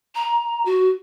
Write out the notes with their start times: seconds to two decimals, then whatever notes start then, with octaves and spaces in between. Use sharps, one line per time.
0.15 A#5
0.65 F#4